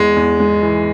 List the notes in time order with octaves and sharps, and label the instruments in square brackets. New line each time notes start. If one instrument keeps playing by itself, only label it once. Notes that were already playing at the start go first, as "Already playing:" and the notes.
Already playing: [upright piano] E2 [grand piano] G#3
[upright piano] E2
G#3
E3